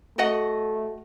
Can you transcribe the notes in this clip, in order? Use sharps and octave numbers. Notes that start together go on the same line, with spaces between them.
A3 F#4 D#5 F#5